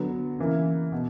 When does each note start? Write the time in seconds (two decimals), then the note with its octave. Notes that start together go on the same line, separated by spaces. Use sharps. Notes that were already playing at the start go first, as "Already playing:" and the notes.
Already playing: D3 F#3 B3
0.39 C#3 E3 A#3 E4
0.92 B2